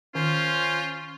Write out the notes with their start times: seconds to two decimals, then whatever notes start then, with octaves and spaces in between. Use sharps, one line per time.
0.15 D#3 C#4 F4 C5